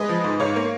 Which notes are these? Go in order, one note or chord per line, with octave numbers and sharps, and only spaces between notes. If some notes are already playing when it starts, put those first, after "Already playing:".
Already playing: G#3 B4 D#5
F3
G#2
G#2 C#5 F5
A#3